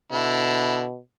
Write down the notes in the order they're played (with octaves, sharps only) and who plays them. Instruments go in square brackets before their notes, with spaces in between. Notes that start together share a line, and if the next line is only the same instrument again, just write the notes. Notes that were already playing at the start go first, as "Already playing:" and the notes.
[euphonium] B2 [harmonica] D3 E4